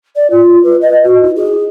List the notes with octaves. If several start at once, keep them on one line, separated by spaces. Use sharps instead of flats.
D5
F4
B4
D#5
F#4
E4
G#4